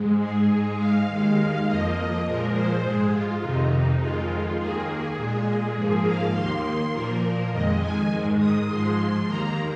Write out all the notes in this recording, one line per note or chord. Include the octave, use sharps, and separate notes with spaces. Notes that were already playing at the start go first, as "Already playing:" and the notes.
Already playing: G#2 G#3
G#4
G#2 G#3
F5
D#2 D#3 G#3
F2 F3 A#3 D#5
A#2 F3 G#3 A#4
C5
G#2 G#3 G#4
F4
F2 C3 D#3 D#4
F2 D#3 G#3 F4
D#2 D#3 A#3 G#4
G#4
A#2 G#3
G#2 F3 A#3
F5
D#2 D#3 A#3 C6
A#2 F3 A#3 A#4
F2 D#3 G#3 D#5
G#5
G#2 D#3 G#3
D#6
G#2 F3 G#3 C6
D#2 D#3 A#3 A#5